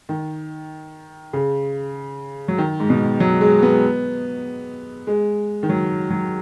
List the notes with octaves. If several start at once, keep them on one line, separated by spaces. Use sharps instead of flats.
D#3
C#3
F#3
D#3
G#2
B2
F#3
G#3
B3
G#3
D#3
F#3
F#3